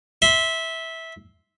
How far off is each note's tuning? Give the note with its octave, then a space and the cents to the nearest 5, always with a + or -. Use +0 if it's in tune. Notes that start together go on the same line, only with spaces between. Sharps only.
E5 -15 C6 +0